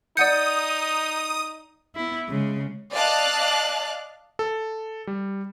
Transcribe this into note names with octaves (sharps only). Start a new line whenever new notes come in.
D#4 D5 F#5 D#6 G6 C#7
B3 E4
C#3 G#3
D5 D#5 F5 A5 F#6
A4
G3